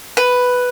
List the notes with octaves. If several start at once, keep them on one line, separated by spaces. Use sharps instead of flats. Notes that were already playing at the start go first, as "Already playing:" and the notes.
B4